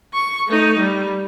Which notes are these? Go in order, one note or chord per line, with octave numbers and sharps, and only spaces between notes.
C#6
A3 D#4
G3